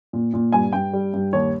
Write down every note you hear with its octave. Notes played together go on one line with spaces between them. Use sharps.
A#2
A#2
G2 G#5
G2 G5
G3
G2
D#2 C#5